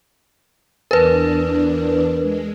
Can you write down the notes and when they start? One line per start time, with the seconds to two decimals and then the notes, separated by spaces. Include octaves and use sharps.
0.91 E2 D4 A#4 B4
2.22 G#3